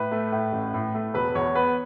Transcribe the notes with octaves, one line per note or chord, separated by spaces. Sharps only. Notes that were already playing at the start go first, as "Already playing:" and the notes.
Already playing: A2 B4
A3
A2
A1
A2
A3
E1 B4
E2 C#5
B3 B4